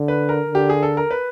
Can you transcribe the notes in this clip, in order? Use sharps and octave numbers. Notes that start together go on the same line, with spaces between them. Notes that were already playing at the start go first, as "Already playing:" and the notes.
Already playing: D3
B4
A#4
D3
G4
G#4
A4
A#4
B4